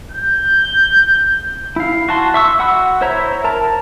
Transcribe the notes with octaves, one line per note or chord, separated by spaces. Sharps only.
G6
E4 F5
F#4 A5 C6
E5 C#6 E6
F#4 F#5 B5 E6
E4 C5 C#5 E5 A#5
A#4 A5 A#5